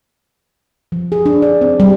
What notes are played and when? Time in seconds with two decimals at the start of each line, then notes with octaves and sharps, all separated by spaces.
0.92 F3
1.12 G#4
1.26 D4
1.42 D5
1.61 C4
1.80 G3